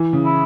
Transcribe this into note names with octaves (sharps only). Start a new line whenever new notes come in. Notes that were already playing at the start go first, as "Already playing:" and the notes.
Already playing: E3
C#3
E4